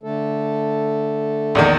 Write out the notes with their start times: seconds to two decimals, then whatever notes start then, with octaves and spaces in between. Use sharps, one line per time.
0.03 D3 A3 A4
1.55 A#1 E2 D#3